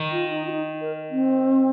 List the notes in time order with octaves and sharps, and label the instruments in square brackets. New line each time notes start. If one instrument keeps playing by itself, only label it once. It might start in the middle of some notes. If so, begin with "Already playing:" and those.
Already playing: [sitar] D#3
[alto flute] F4
D#4
F4
D#4
A#4
C4